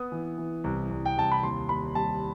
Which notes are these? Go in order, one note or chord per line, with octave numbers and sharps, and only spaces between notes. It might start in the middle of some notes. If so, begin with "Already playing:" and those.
Already playing: B3 D#6
E3
E3
C2
C2
G5
C2 A5
B5
D#2 C6
D#2 B5
G3 A5